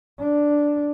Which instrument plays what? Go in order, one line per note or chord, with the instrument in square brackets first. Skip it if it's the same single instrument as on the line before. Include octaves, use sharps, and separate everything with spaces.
[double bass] D4